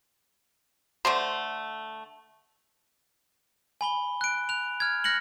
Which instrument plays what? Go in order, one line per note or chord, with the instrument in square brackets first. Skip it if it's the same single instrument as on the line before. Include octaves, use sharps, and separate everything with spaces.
[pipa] D3 A3 C5
[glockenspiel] G#5 B5 G7
F#6 D7
F#6 F7
F6 G#6
F6 F#6 A#6 C#7 F#7